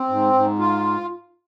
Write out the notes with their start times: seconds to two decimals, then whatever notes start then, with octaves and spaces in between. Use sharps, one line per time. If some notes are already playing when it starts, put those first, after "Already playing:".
Already playing: C4
0.09 G#2
0.33 G#2
0.59 F4